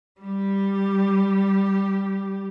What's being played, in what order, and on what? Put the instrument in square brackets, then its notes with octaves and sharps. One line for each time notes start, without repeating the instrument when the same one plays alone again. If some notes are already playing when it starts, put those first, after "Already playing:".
[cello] G3 G4